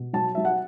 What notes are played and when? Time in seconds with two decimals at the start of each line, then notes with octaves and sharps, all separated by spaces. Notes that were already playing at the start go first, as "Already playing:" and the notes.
Already playing: B2
0.13 F#3 A5
0.35 F#3 E5
0.45 F#5